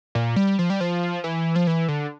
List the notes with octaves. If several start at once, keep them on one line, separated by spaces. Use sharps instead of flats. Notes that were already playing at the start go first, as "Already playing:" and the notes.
A#2
G3
F3
G3
F3
E3
F3
E3
D3